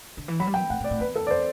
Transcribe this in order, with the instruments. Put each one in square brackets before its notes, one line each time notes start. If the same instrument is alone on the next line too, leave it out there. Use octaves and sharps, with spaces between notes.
[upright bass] D3
E3
[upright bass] F#3 [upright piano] B5
[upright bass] G3
[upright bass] F#3 [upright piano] G5
[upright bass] A2 [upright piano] F#5
[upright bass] A2
[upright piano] D5
[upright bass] A2
[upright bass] E2 [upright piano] B4
[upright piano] A4
D5
C5